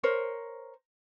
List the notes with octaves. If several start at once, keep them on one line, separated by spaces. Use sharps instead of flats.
A#4 C5 C#5